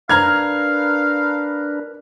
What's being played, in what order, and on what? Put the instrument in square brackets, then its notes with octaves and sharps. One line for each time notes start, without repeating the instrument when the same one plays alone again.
[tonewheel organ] D4 A#4 B4 [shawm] F5 [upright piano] A#5 F6 G#6